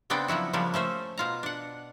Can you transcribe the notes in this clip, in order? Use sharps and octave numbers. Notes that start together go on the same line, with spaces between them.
C#3 B3 C4 D4 D5 G5
F3 F#3 E4 F#4
C#3 F3 G3 A#3 D4
A3 C#4 C5 E5
B2 F4 A#5
D4 F#5